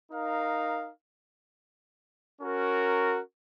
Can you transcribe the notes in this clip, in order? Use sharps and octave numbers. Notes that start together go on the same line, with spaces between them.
D#4 A#4 F5
C#4 F#4 A#4